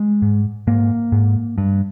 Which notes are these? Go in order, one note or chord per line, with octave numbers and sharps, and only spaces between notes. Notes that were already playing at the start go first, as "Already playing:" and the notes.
Already playing: G#3
G#2
G#2 A#3
G#2
G2